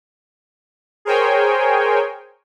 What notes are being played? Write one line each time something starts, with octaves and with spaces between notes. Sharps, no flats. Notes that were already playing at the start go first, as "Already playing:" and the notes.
G#4 A#4 C5 C#5 G5 G#5